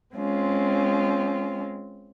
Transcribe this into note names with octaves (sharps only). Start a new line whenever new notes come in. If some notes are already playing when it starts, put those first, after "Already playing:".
G#3 C4 C#4 F4